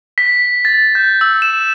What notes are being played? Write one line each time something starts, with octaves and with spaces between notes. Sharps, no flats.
B6
A6
G6
E6
E7